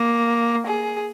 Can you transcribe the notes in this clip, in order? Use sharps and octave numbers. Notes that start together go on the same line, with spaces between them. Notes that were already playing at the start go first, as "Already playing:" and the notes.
Already playing: A#3
G#4